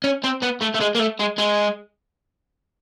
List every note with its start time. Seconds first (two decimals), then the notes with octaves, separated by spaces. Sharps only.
0.04 C#4
0.24 C4
0.43 B3
0.62 A3
0.75 A3
0.81 G#3
0.95 A#3
1.00 A3
1.20 G#3
1.38 G#3